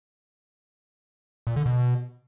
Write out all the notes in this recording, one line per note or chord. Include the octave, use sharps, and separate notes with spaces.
A#2
D3
B2